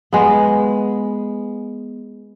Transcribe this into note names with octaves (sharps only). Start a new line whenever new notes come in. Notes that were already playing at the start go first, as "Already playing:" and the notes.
G#3 B3